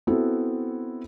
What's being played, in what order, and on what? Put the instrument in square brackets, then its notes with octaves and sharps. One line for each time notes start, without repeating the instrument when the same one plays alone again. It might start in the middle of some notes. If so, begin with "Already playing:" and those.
[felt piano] B3 C4 E4 F#4 A4